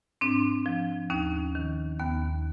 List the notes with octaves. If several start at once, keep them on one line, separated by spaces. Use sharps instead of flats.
G#2 C4 D4
F3
D#2 C#4 D#4
D#3
D#2 B3